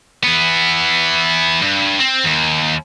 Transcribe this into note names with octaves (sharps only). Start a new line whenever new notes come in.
E3 B3
G2
C4
D#2